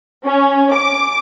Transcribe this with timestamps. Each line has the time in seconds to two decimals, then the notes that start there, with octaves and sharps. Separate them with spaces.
0.25 C#4
0.73 D6